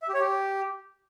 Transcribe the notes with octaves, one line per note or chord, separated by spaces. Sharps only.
E5
G4
C#5
G4